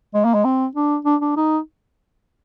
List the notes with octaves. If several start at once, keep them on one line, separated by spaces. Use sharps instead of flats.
G#3
A#3
G#3
C4
D4
D4
D4
D#4